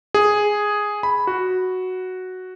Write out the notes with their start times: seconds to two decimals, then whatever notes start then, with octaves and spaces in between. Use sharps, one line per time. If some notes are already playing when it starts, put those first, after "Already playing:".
0.14 G#4
1.03 B5
1.27 F#4